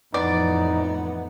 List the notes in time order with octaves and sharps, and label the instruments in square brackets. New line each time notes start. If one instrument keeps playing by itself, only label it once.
[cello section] F2 A2 E3 [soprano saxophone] B3 [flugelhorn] D#4 [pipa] D5